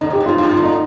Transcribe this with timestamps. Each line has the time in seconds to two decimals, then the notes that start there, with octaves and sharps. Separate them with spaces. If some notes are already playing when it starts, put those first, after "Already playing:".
0.01 D3 D#4
0.10 C3 G4
0.20 A2
0.26 G2 F4
0.38 G2 F4
0.51 F4
0.57 D3
0.64 D#4